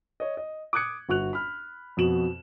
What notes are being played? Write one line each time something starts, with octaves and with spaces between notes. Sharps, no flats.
C#5 D#5
D#5
D6 D#6 F#6 G#6 C#7
G1 F#4 C#6 F#6 F7
B5 F6
F2 B2 F#4 E7 F#7